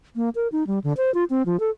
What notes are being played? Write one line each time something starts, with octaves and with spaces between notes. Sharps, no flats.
A#3
A#4
D#4
G3
D3
C5
F4
C4
F3
A4